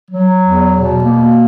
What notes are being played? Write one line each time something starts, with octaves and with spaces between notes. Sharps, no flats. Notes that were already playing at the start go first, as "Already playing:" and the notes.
F#3
E2
B2
A#3